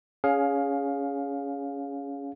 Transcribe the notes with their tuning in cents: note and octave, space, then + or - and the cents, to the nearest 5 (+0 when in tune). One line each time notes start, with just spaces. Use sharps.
C#4 +15 G#4 +0 F5 +15